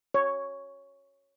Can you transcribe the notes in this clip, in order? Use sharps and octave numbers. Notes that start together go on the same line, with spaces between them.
C#5